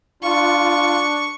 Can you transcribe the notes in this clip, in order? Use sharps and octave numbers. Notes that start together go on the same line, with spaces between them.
D4 F4 C#6